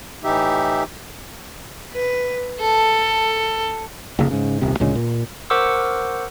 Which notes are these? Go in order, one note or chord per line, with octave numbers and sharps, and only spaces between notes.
A2 E3 D#4 G4 E5
B4
A4
F1 D2 C#3 A#3
G#2 C#3
D#1 C2 C3
D2 A#2 C#3 G#3
A#2
A#4 C5 F#5 C#6 D6 E6